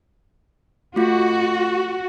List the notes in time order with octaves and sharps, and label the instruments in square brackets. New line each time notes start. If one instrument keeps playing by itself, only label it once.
[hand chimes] A3 F4 [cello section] F#4